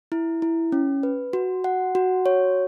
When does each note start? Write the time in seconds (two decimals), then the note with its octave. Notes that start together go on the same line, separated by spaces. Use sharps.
0.12 E4
0.42 E4
0.72 C#4
1.03 B4
1.33 F#4
1.64 F#5
1.95 F#4
2.26 C#5